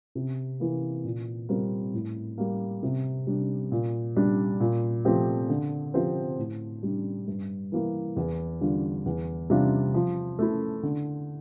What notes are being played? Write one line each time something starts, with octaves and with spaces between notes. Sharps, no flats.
C3
E3 A#3
A#2
G3 C4 F4 A#4
A2
G3 A#3
C3
G3 D4
A#2
G3 D4
A#2
F3 A3 C4 G4
D3
F3 C4 G4 C5
A2
G3 D4
G2
E3 A#3 E4
E2
D3 G3 D4 F4
E2
C3 G3 D4 F4
F3
A3 E4
D3